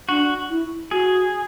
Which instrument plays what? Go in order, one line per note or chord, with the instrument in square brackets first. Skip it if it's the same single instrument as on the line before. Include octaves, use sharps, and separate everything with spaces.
[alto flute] D4 [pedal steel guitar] F#4
[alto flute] E4
[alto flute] F#4 [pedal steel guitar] G#4